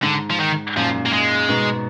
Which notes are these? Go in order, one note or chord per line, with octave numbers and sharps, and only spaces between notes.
G#2 D3
F3
D#3
F#2 A#2 F3
A#3
G#3
G#2 B2